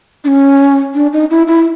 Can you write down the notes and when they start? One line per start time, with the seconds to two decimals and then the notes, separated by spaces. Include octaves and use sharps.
0.24 D4
0.28 C#4
0.95 D4
1.13 D#4
1.30 E4
1.47 E4